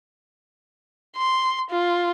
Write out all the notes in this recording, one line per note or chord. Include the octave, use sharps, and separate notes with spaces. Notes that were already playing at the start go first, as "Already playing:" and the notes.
C6
F4